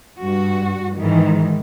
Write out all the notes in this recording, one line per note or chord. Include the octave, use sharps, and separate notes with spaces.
G2 F#4
G#2 D#3 E3